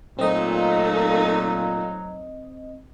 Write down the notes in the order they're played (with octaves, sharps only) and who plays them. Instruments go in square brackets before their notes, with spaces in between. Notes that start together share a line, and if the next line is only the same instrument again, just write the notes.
[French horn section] A#2 [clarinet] F#3 [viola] A3 D#4 [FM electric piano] C4 D#5